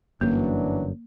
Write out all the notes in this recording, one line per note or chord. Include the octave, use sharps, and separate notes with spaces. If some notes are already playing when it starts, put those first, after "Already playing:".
G1 F#2 E3 F#3 A#3 D4